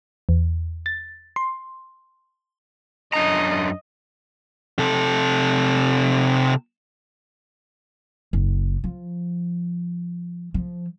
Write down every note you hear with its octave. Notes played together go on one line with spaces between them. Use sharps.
E2
A6
C6
F#2 D4 D#5 A#5
C3 A4
F#1
F3
F3